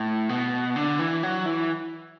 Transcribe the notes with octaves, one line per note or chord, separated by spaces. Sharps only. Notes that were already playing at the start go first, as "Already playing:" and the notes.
Already playing: A2
B2
D3
E3
F#3
E3